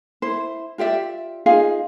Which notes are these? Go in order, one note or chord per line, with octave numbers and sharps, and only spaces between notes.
E4 C5
F4 G4 D5 E5
D#4 F4 G#4 F5